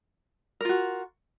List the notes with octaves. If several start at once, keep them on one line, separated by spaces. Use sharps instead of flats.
F4 F#4 A#4